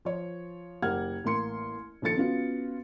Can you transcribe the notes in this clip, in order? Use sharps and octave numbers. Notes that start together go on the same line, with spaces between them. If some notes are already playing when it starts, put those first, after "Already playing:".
F3 C#5
F#1 G4 A#4 F#5 F6 G#6
A1 A#3 C6 C#7
A#1 D#3 F3 A4 A6 C#7
B3 C#4 F4 F#4